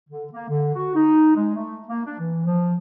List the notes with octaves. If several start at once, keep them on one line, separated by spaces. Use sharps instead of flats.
D3
A#3
D3
F#4
D#4
G#3
A3
A#3
D4
E3
F3